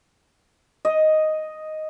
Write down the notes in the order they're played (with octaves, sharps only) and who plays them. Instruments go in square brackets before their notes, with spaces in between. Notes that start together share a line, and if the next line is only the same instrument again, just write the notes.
[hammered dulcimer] D#5